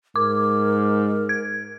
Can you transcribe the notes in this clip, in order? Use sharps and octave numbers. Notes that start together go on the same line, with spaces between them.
G#2 A#4 D6
G#6